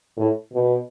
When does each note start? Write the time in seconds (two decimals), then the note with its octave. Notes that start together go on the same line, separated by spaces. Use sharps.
0.17 A2
0.53 B2